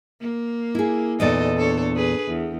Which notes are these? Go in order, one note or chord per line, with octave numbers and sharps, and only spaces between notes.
A#3
E4 G#4
E2 A#2 D#4 A4 D5 D#5
D4 A4 C#5
G#4 B4
E2